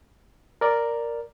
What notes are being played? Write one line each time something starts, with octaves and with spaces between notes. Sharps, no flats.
A#4 D5